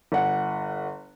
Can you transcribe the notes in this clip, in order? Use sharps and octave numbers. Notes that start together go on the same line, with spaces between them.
G1 F#5